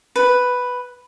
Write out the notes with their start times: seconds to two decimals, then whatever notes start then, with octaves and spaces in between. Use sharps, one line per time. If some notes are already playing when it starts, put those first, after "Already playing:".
0.16 B4